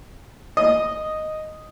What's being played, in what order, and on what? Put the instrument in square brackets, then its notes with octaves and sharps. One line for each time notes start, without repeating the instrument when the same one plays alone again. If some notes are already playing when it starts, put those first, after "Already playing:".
[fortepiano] D#5 D#6